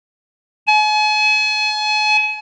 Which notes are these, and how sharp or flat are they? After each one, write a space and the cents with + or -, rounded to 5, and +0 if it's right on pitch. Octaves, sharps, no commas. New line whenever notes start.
G#5 +40